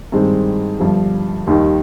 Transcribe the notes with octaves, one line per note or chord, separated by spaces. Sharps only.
G2 D#3 G#3 C4
G1 G2 F3
D#2 D#3 G3